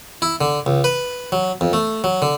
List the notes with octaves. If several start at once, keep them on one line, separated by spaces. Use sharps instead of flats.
E4
D3
C#2
B4
F#3
F2
A3
F#3
D3